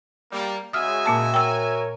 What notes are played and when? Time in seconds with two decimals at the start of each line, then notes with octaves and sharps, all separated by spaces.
0.31 G3 A#3
0.73 C#3 G#3 F#4 E5 G#5 D#6 F6
1.06 A#2 A#3 A5
1.34 A#4 C#5 G5 E6